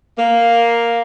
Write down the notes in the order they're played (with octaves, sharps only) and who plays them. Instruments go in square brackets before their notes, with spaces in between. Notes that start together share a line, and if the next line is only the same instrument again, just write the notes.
[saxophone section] A#3